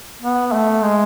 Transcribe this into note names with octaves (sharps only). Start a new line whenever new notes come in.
B3
A3
G#3